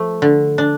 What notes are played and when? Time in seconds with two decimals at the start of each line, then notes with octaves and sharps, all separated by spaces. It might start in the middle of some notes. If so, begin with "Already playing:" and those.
Already playing: F3 A3
0.22 D3
0.58 D4